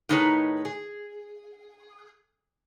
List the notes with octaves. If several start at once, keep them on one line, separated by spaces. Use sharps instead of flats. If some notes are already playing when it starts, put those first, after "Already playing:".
A2 D#3 D#4 G#4 B4 C#5
G#4